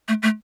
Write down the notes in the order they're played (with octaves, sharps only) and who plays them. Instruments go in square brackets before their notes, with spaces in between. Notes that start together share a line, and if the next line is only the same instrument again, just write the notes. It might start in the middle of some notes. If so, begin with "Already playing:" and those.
[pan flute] A3
A3